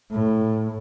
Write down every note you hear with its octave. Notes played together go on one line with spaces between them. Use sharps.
A2